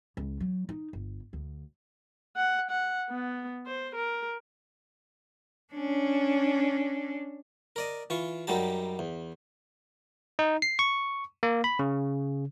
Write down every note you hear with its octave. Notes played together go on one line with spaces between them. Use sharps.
C#2
F#3
D#4
G1
D2
F#5
F#5
B3
C5
A#4
C#4 D4
A#4 D5 D#5
E3 F4 C#6
F#2 F#3 G3 D#4 G4 A5
E2
D#4
C7
C#6
A#3
B5
C#3